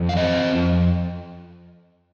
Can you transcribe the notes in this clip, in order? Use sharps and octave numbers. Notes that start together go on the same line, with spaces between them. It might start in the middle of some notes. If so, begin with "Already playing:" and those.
Already playing: F2
F5
C4 C5 D#5
F2